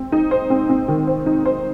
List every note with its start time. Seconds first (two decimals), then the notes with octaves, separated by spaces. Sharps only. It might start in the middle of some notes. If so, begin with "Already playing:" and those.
Already playing: C4
0.12 D#4
0.31 C5
0.50 C4
0.69 C4
0.88 D#3
1.07 C5
1.26 D#4
1.46 C5